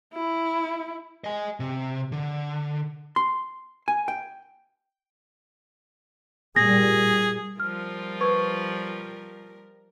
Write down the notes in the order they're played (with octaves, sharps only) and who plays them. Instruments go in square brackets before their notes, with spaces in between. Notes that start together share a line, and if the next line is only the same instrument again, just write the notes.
[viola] E4
[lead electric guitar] D#5 G#5
C3
D3
[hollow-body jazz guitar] C6
G#5
G5
[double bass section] A#2 G3 [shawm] G#4 [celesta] A#6
[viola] F3 F4 [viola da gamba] G3 A#4 [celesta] F6
[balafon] B4 [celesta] C#6